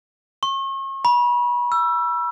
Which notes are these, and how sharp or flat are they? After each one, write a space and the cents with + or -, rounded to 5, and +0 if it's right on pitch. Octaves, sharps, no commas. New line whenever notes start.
C#6 -40
B5 -35
E6 +20